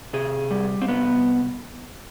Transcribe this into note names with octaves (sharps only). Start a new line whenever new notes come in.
C3 G#4
G3
C4
C3 B3